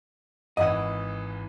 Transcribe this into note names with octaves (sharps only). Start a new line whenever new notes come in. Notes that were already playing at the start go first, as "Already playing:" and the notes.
G#1 G#2 E3 D#5 F#5